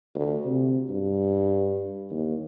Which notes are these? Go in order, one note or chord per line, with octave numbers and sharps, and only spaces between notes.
D2
C3
G2
D#2